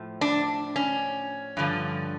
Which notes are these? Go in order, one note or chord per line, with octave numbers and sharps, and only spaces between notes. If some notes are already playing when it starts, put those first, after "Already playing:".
Already playing: A2 F3
D4
C#4
G2 D3 F3